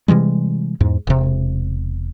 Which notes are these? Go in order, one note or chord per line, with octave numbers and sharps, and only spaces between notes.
C3 E3 G3 G#3
E2 G#2
E1 C3